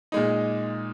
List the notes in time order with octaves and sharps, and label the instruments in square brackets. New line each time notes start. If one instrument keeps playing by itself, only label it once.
[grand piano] A#2 G#3 D#4